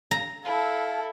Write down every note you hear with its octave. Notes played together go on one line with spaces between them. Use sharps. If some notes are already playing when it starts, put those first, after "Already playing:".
A#5
E4 A4 F5